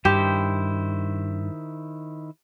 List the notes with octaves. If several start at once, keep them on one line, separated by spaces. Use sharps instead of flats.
G2 D#3 E4 G4 C5